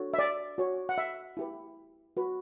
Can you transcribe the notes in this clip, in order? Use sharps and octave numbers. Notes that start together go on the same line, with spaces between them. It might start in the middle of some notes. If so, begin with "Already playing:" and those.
Already playing: D4 F#4 A4 C#5
E5
D5
F#4 C#5
F#5
E5
E4 G4 B4
F#4 B4